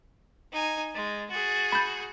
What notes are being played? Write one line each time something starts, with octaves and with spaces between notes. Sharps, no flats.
D#4 G#5
G#3 A6
F#4 G#4 A6
B5 G6